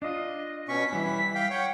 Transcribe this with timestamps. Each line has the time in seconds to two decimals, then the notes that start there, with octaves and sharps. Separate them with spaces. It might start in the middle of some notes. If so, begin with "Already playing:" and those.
0.02 D4 F4 D#5
0.69 B2 C#4 C#6 B6
0.93 E3 G3 E4
1.35 F5 G5
1.50 C#5 F#5 G5